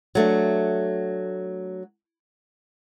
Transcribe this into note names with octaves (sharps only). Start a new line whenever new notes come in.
F#3 A3 D4